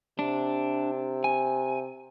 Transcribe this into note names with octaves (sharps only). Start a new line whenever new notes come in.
C3 D4
G#5